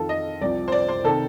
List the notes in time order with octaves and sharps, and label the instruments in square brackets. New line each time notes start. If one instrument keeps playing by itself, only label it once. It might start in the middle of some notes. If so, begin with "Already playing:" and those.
Already playing: [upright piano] F2 D#3 F4 A4
D#5
C2 C3 F3 D5
C5
D5
C5
C3 D#3 A4